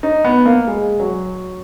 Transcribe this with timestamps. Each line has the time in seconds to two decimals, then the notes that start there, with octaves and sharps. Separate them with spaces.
0.03 D#4
0.25 B3
0.46 A#3
0.68 G#3
1.00 F#3